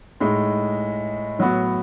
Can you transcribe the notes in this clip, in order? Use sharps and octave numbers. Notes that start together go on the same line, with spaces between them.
A2 G#3 D#4
A2 F#3 B3 F#4